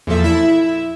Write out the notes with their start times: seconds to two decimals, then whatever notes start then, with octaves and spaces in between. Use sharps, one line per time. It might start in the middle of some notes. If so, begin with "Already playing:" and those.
0.07 E2 A#2 F3 A4 E5
0.24 E4 E5